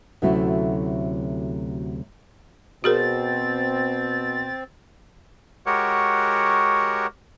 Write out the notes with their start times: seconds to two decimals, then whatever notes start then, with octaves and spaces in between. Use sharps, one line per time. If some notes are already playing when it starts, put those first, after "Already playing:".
0.22 D2 C3 F#3 A3 C#4 E4
2.84 B2 C4 F#4 G#4 A#4 A6
5.66 G#3 F#4 G4 A#4 C#5 F#5